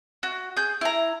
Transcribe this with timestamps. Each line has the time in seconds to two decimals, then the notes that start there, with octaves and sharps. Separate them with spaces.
0.23 F#4
0.57 G#4 G6
0.81 E4 A#5